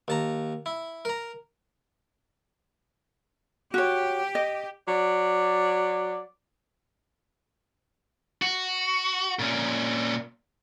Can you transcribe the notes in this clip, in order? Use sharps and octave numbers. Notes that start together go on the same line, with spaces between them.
D#2 A5 A#5
E4
A#4 A#5
F#4 G4 C#5
D#5
F#3 D5
F#4
A#2 C#4